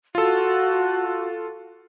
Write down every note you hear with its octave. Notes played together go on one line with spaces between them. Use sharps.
F4 F#4 A4